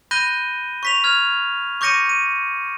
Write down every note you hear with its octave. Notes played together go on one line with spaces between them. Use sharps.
B5 F#6 G6 A#6 D#7 G7
C#6 B6 F7
F6 G#6 F7
C#6 D6 G6 A#6 C#7 D#7
D#7